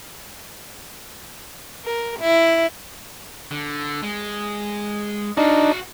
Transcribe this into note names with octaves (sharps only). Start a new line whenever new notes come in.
A#4
E4
D3
G#3
D4 D#4 F#4 F5